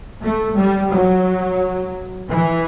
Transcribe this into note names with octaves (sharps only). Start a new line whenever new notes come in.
A3
G3
F#3
E3